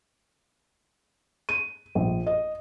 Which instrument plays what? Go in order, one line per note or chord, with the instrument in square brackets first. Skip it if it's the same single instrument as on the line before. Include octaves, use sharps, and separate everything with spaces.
[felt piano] D#7
A#1
D#5